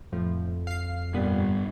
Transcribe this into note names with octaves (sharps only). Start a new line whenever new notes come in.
F2 A2 F3
F5 C7
G2 A#2 G3 B3